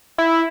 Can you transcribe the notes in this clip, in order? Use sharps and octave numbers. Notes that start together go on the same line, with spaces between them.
E4